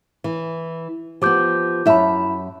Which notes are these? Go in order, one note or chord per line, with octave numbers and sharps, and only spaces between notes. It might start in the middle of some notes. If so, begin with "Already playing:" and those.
E3
F3 B3 G4 D6 G6
F#2 E4 E5 A5 B5